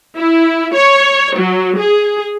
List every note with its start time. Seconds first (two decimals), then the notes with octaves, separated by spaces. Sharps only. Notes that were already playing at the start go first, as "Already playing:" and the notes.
0.17 E4
0.75 C#5
1.38 F#3
1.78 G#4